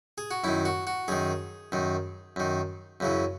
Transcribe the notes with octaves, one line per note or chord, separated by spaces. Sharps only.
G#4
F#4
F#2 D#3 E4
F#4
F#4
F#2 D#3 G#4
F#2 D#3
F#2 D#3
F#2 C#3 E3